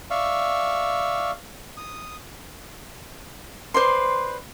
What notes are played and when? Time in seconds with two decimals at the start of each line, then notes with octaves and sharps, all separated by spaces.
0.11 D5 E5 F5 C#6 E6
1.77 D#6
3.74 B4 C5 D5 C6